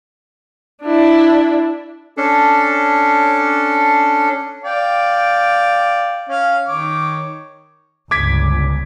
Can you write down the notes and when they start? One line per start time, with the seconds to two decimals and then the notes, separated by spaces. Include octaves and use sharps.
0.83 D4 E4
2.17 C#4 D4 A4
4.64 D5 F5 G5
6.29 C#4 F5
6.68 D#3 C#5 D6
8.11 G1 C#2 D6 G#6 B6